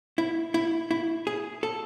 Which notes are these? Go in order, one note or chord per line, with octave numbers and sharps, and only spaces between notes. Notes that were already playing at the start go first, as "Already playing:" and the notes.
E4
E4
E4
G#4
A4